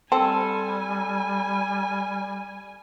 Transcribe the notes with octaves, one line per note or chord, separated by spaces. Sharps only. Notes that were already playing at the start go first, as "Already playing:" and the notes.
G3 C4 A4 G#5